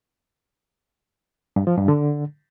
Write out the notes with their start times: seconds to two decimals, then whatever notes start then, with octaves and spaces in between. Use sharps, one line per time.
1.56 G2
1.67 F3
1.78 G2
1.88 D3